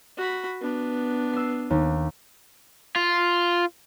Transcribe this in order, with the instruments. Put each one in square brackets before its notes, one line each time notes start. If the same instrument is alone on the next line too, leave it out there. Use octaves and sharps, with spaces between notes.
[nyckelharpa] F#4 B5
B3 D4
[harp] E6 C7
D#2
[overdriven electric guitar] F4